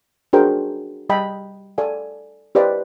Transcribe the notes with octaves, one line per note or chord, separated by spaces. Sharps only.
D4 F#4 G#4 A#4 C5 G5
G3 D#5 G5 A5 B5
A4 D5 F5 G#5
G4 B4 C5 D5 D#5 F5